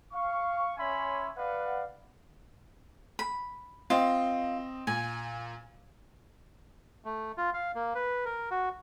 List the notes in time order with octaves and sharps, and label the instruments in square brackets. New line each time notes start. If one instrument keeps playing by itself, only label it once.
[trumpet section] F5 C#6
C#4 C#5 E5 G#5 B5 C6
B4 D5 F5 F#5
[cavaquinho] B5
[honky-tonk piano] C4 D#5 [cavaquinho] F4
[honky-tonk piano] A#2 [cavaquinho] G#5
[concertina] A3
F4
F5
A#3
B4
A#4
F#4